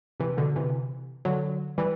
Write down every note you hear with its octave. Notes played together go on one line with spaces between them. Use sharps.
C3 E3
B2 D3
C3 E3
D3 F#3
E3 G3